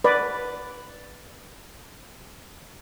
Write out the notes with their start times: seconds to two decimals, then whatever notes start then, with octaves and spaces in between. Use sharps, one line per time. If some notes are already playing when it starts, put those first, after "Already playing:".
0.04 B4 D5